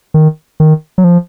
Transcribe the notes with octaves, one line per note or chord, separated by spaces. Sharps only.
D#3
D#3
F#3
F3